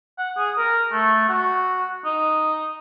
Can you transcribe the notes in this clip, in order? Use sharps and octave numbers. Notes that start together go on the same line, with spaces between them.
F#5
G#4
A#4
A3
F#4
D#4